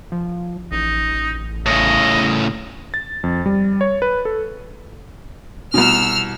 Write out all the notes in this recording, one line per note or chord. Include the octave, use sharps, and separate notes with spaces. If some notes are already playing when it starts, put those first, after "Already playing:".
F3
A1 D#4
A2 C#3 D#5
A6
F2
G3
C#5
B4
A4
C2 B2 E6 F6